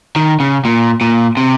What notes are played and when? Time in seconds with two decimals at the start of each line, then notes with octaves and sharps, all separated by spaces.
0.16 D#3
0.40 C#3
0.65 A#2
1.01 A#2
1.37 C3